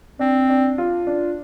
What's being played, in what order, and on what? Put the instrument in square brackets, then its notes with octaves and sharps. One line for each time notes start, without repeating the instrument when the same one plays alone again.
[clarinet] C4 [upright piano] D4
[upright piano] D4
F4
D4